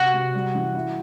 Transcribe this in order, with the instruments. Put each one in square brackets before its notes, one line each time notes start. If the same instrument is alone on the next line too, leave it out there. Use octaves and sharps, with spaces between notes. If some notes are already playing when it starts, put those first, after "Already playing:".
Already playing: [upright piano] C3 [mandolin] F#4
[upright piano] C3
G3
E3
E4